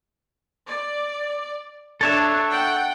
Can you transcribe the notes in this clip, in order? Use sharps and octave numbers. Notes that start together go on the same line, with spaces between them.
D5
D4 A4 C#5 E5
F#5 G5